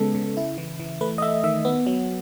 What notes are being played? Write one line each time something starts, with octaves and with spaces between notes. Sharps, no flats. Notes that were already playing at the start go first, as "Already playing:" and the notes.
Already playing: C#3 G#3 B3 A4
C#3
E4
E3
E3
A3 B4
D#5
A3 E5
D#3 E5
B3
F#3